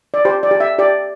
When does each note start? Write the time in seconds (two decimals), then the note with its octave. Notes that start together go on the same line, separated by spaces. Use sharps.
0.14 D5
0.25 G4 C5
0.43 D5
0.51 G4
0.60 E5
0.79 G4 D5